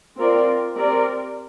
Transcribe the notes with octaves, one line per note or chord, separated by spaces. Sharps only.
C4 F4 A#4 D5
C4 G4 A#4 D5